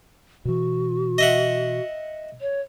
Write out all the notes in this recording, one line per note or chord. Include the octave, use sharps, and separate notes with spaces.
B2 E3 F#4
D#5 E5 F#5
C#5